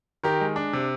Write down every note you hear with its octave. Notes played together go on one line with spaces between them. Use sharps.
D#3 G4 A#4
G#3
D4
C3